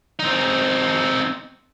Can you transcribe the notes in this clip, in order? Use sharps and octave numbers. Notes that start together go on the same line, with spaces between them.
C4 D#4